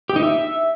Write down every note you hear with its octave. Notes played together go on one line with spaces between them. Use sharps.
G4
D#4
E5